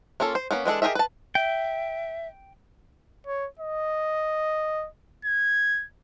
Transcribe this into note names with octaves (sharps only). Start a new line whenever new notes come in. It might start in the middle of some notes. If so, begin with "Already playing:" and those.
A#3 C#4 F4 A4
C5
A#3 B3 C#4
E3 G#3 D4 A4
G4 G#4 A#4 D#5 E5
B4 A5
E5 G5
C#5
D#5
G#6